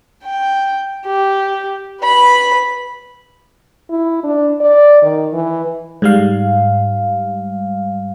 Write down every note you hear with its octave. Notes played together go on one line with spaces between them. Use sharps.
G5
G4
B4 B5
E4
D4
D5
D#3
E3
G#2 G3 F5